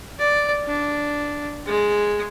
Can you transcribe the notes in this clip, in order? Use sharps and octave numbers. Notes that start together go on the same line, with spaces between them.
D5
D4
G#3